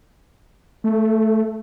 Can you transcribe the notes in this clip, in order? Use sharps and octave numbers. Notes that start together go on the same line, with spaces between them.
A3